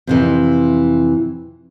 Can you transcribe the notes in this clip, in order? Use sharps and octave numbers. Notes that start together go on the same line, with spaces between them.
F2 C3 E3